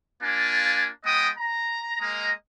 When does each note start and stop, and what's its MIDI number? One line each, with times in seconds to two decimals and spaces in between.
0.23 0.87 58
0.23 0.87 62
0.23 0.87 65
0.23 0.87 80
1.05 1.29 56
1.05 1.29 59
1.05 1.29 75
1.05 1.29 79
1.05 1.29 87
1.38 1.97 82
2.00 2.31 56
2.00 2.31 58
2.00 2.31 75
2.00 2.31 82